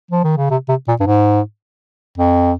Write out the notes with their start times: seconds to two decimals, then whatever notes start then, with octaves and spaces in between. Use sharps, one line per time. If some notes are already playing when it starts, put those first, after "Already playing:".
0.11 F3
0.24 D#3
0.37 C#3
0.51 C3
0.69 C3
0.88 A#2
1.00 G2
1.07 G#2
2.18 F2